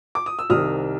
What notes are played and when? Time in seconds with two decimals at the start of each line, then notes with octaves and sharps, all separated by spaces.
0.15 D6
0.26 D#6
0.39 E6
0.50 C2 C3 D#3 D#6 F6